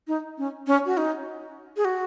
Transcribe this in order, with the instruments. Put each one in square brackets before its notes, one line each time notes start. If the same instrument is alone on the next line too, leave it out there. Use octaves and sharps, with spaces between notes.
[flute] D#4
C#4
C#4
F#4
D#4
G#4
F#4